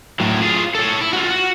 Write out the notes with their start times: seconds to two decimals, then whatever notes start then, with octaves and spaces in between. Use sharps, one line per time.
0.20 A2 F#3
0.42 F4 G#4
0.75 A4 C#5
1.01 E4
1.13 F4 F#4
1.30 F#4